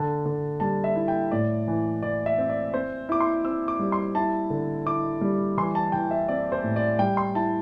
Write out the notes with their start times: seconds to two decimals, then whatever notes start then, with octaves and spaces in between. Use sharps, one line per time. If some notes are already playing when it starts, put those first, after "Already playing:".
Already playing: D3 A5
0.26 D3
0.60 G3 A5
0.84 E5
0.96 E4
1.08 G5
1.31 A2 D5
1.68 E3
2.03 E3 D5
2.26 E5
2.38 C4
2.49 D5
2.74 C4 C5
3.09 E4 D6
3.21 C6
3.45 C4 E6
3.68 D6
3.80 G3
3.92 C6
4.15 E4 A5
4.50 D3
4.86 E4 D6
5.21 G3
5.57 E3 C6
5.75 A5
5.92 E3 G5
6.11 E5
6.28 C4 D5
6.52 C5
6.63 A2
6.76 D5
6.99 G3 G5
7.17 C6
7.35 E4 A5